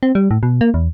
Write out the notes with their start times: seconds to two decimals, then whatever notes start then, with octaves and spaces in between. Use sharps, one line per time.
0.03 C4
0.15 G3
0.31 A2
0.43 B2
0.61 A#3
0.74 E2